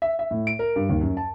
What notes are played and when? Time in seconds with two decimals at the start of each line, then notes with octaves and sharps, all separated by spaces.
0.02 E5
0.19 E5
0.31 A2
0.47 D7
0.59 A#4
0.76 G2
0.89 D#2
1.01 F#2
1.17 A5